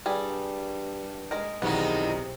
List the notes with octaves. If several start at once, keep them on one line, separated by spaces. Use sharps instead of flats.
G2 G3 G#4
G#3 G#4 A#4
B1 E2 C3 D#3 A#3 B3